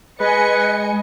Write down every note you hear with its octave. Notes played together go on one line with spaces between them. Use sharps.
G#3 B4 D#5 G#5 C#7